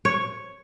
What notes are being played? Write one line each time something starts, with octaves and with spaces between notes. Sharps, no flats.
C#5